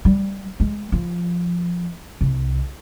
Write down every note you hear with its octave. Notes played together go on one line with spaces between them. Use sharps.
G3
G#3
F3
C2